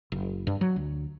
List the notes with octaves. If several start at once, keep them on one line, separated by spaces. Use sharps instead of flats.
F#1
G2
F#3
D2